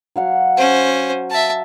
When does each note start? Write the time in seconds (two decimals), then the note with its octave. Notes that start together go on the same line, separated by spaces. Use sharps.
0.16 F#3 F5 F#5
0.57 C#4 C5
1.30 E5 A5